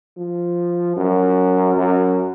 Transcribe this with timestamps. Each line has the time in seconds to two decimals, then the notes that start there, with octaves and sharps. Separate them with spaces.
0.17 F3
0.97 F#2
1.76 F#2